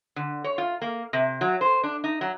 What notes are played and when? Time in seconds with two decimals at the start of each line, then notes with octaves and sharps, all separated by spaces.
0.16 D3
0.44 C#5
0.58 F4
0.82 A#3
1.13 C3
1.41 F#3
1.61 C5
1.84 D4
2.04 D#4
2.21 F#3